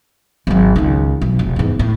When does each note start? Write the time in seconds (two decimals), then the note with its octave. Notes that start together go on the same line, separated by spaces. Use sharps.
0.47 G#1 F#3
0.76 C#2 D#3
1.21 B1
1.39 F1
1.56 E2 G#2
1.79 A2